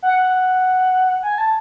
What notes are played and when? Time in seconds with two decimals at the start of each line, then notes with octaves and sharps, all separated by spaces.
0.02 F#5
1.23 G#5
1.38 A5